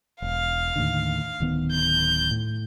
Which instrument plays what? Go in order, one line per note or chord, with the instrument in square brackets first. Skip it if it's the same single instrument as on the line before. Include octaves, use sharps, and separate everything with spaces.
[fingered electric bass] E1 [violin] F5
[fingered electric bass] D#2 A2 D3
D1 D#3 B3
[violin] G6
[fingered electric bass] A2